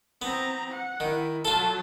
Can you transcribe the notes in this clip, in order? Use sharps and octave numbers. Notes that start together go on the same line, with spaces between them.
B3 C4 A#5
F#5
D#3 E4
F#3 F4 A4 A5